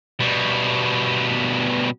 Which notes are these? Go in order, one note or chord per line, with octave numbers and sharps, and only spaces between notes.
B2 G3